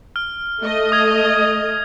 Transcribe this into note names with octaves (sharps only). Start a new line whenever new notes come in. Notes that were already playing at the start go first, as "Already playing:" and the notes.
F6
A3 D#5
D#6 G#6